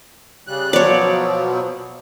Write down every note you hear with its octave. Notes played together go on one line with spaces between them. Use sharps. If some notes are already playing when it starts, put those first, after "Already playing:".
C#3 G3 F#6
B2 F3 F#3 C#5 D5